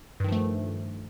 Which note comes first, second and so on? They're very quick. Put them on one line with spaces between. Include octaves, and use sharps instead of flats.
G2 D#3 F3 A3